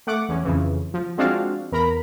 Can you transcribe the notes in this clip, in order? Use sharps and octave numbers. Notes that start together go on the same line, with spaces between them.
A3 F#5 D6
E2 C#4
F2 C#3 E3
F3
F3 G#3 C4 D4 F#4 F5
E2 A#4 A#5 B5